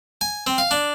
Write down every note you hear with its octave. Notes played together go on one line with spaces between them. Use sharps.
G#5
C4
F5
D4